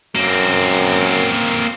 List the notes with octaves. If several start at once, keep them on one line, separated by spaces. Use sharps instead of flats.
F#2 A#3 C4